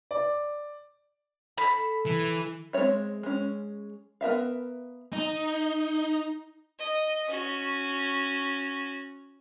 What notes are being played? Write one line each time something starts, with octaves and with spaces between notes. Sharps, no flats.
D5
A4 B5
E3
G#3 C4 F4 C#5 E5
G#3 C#4
B3 A#4 E5 F5
D#4
D#5
C#4 F#4